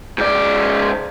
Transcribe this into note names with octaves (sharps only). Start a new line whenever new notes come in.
G#2 D5